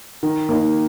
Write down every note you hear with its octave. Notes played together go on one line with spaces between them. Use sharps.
D#3
A#3 D#4